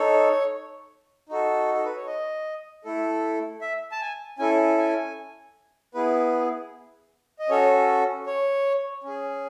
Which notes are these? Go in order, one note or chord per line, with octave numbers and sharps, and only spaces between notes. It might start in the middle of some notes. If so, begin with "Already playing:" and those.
Already playing: D#4 A4 C#5
D#4 F#4 A4
A4
B4
C#5
D#5
A3 E4 A4
E5
A5
G#5
C#4 E4 A4 G#5
G#5
B3 E4 G#4 B4
D#5
C#4 F#4 A4 C#5
C#5
C#4 G#4